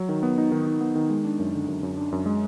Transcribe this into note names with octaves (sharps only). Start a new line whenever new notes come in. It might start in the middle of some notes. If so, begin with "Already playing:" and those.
Already playing: F#3
D#3
B3
D#4
D#3
D#4
B3
D#3
G#3
D4
F#2
D3
F#2
F#2
D4
F#2
G#3